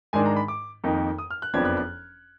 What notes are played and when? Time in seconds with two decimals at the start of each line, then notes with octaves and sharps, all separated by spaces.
0.13 G#2 D#3 G#3 D4 G#5
0.25 A#5
0.36 B5
0.48 D6
0.84 F2 D#3 A#3 D#4
1.18 D#6
1.31 F6
1.42 F#6
1.54 F#1 F2 F3 B3 D4 G#6
1.65 F#6
1.77 F#6